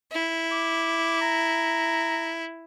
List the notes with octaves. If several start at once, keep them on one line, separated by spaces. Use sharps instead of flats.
E4
D6
A#5